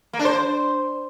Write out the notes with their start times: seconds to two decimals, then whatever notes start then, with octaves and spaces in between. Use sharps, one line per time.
0.13 A#3
0.19 D4
0.25 C5